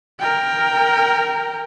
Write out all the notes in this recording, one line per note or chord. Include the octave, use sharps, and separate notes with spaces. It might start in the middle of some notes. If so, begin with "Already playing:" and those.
A#4 G5